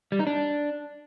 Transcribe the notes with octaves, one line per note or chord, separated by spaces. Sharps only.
G3
D#4
D4